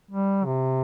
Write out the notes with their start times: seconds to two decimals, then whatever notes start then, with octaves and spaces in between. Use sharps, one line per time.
0.11 G3
0.45 C3